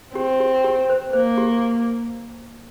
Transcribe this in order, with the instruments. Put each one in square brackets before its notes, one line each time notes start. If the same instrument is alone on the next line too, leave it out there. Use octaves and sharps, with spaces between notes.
[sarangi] C4 [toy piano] G4
[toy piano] G4
G4
C5
[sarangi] A#3 [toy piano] C5
[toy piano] G4